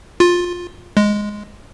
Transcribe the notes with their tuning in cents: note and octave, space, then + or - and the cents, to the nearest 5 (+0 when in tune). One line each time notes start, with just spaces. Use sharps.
F4 +15
G#3 +0